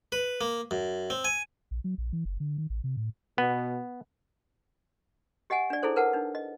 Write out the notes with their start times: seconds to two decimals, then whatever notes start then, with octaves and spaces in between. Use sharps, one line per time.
0.12 B4
0.41 A#3
0.71 F#2
1.10 C4
1.25 G#5
1.71 A#1
1.84 F#3
1.98 A#1
2.13 E3
2.25 F#1
2.40 D3
2.58 D#3
2.70 A1
2.84 C3
2.97 A2
3.38 B2 B3
5.50 G4 D#5 F#5 G#5
5.70 D4 D5
5.83 D#4 E4 G#4 A4 C5
5.96 A#4 B4 F#5 A5
6.13 D4 D#4
6.35 D#5